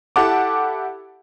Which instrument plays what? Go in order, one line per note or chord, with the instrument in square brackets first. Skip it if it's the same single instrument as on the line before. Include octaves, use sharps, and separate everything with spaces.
[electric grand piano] E4 G4 A4 F#5 A5 D6